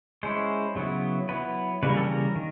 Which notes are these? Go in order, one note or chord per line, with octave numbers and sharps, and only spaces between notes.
G#3 C#4 E4 C5
C#3 F#3 B3 E4
F#3 B3 E4 B4
C#3 E3 G3 A#3 B4
A#4
A4
A#4
D#3